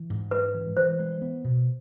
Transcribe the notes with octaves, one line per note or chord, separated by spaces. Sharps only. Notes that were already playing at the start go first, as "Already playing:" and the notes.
Already playing: E3
G#2
G#3 B4
E3
E3 C5
G#3
B3
B2